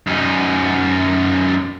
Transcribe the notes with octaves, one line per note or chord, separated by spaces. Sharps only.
F#2 D#4